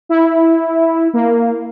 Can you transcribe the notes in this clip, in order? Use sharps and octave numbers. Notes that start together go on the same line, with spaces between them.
E4
A#3